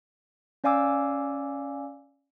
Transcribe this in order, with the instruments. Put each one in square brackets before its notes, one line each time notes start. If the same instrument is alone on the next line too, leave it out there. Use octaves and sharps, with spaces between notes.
[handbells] C#4 D5 F5 G#5 D6 E6